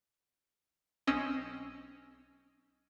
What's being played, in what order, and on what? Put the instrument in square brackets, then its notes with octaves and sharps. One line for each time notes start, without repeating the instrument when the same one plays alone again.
[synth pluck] B1 C4 C#4 D#5 E6